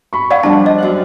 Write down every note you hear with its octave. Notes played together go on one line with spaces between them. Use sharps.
B5 C#6
D5 F5 F#5
F3 G3 D4 A5
D#5
F#2 F5 F#6